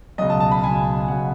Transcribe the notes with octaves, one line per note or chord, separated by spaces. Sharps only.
C#2 B2 F#3 D#5
A5
A5
B5
C#2 B2 F#3 G#5
G#5
C#2 B2 F#3 F#5